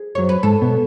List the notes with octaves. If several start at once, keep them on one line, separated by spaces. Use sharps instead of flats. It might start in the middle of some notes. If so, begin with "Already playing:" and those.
Already playing: G#4
F#2 F#3 C#5
B4
G#2 G#3 A4
B2 B3